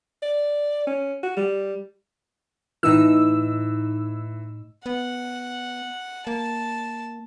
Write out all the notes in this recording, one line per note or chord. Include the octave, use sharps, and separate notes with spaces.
D5
C#4
F#4
G3
A2 E3 D#4 E6
B3 F#5
A#3 A5